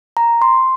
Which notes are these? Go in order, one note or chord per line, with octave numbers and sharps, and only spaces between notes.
A#5
C6